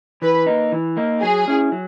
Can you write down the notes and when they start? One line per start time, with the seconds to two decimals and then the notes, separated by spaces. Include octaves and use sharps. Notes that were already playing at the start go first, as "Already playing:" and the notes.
0.22 E3 B4
0.47 A#3 D#4
0.72 E3
0.97 A#3 D#4
1.22 F#3 G#4
1.48 C#4 E4
1.72 F#3